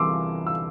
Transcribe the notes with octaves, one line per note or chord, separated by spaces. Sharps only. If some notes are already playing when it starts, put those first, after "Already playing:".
Already playing: C2 C3 E3 C6 D6 E6
E6